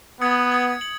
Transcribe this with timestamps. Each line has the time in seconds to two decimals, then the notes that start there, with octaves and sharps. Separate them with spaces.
0.21 B3 D#6 G#6 C#7
0.51 D#6 G#6 C#7
0.81 C#7 F#7